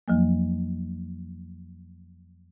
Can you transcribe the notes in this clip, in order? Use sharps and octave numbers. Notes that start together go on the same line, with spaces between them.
F2 F3 F#3 A#3